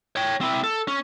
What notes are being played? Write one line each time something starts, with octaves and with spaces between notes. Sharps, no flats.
C#5 G5
C4 E4
A4
C#4